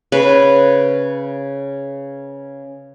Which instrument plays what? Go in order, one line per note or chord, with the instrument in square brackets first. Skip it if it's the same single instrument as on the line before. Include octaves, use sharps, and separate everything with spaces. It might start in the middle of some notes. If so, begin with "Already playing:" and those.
[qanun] C#3 B4